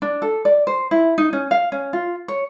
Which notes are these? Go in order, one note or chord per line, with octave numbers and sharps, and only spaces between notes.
D4
A4
D5
C5
E4
D#4
C#4
F5
C#4
F4
C#5